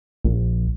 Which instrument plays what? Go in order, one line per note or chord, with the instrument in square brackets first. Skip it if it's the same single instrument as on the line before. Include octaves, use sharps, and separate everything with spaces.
[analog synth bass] A#1